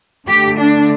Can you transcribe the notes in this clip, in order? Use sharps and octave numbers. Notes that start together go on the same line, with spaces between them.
D3 A3 G4
D4